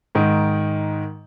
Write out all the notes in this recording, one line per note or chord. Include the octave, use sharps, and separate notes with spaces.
G#2 D#3